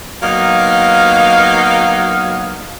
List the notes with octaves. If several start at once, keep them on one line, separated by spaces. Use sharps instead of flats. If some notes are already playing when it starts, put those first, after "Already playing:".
F#3 A#3 B3 D#4 F5